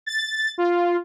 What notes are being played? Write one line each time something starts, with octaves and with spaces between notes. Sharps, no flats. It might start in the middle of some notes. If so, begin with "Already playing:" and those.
A6
F4